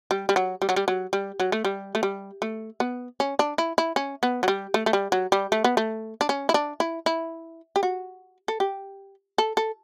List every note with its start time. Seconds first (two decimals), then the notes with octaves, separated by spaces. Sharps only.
0.11 G3
0.29 G3
0.36 F#3
0.62 G3
0.69 F#3
0.76 G3
0.88 F#3
1.13 G3
1.40 F#3
1.52 A3
1.65 G3
1.95 A3
2.03 G3
2.42 A3
2.80 B3
3.20 C#4
3.39 D4
3.58 E4
3.78 E4
3.96 C#4
4.23 B3
4.43 F#3
4.48 G3
4.74 A3
4.86 A3
4.93 G3
5.12 F#3
5.32 G3
5.52 A3
5.64 B3
5.77 A3
6.21 D4
6.29 C#4
6.49 E4
6.54 D4
6.80 E4
7.06 E4
7.76 G4
7.83 F#4
8.48 A4
8.60 G4
9.38 A4
9.57 A4